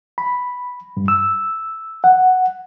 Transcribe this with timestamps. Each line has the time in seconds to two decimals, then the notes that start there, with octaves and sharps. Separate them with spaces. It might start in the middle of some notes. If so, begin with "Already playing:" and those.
0.18 B5
0.97 G2
1.08 E6
2.04 F#5